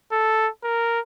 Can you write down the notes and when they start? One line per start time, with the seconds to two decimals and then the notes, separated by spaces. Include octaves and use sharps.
0.12 A4
0.64 A#4